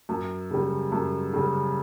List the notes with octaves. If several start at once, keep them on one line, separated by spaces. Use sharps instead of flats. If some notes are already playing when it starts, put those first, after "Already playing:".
F#2
C#3 G3
F#2
C#3 G3